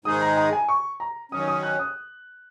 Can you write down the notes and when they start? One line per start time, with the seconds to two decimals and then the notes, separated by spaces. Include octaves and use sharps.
0.05 G#2 D#3 G#3 D#4 G#4 D#6
0.21 A#5
0.37 A#5
0.53 G#5
0.69 C#6
1.00 A#5
1.32 D#3 F#3 C#4 D#6
1.48 D#6
1.63 F#6
1.79 D#6